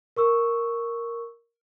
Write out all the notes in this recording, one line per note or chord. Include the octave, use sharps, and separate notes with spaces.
A#4 C#6 E6